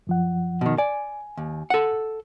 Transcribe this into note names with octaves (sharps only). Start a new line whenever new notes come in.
F#2 F3 F#5
B2 D#3
D5 G#5
D#2
A4 F#5